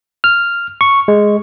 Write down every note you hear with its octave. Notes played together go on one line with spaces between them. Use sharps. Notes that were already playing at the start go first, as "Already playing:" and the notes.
F6
C#6
G#3